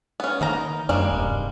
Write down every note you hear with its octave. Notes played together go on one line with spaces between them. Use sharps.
B3 C#4
D#3 A#3 D#4 A#5
F#2 G3 G#3 A#3
D#1 G2 C3